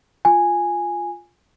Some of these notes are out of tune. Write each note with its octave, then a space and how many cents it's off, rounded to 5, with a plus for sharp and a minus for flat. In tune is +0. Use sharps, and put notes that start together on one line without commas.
F4 +0 G#5 -5